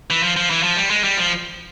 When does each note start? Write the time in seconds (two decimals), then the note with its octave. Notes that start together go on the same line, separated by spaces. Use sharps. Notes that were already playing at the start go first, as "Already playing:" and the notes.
0.10 E3
0.23 F3
0.36 F3
0.50 E3
0.63 F3
0.77 G3
0.90 G#3
1.04 G3
1.17 F3